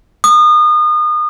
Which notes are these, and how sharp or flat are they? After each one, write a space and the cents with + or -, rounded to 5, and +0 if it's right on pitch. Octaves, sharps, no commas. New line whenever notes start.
D#6 -35